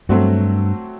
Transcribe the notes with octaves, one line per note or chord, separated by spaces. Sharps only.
G2 F#3 A3 C4 F#4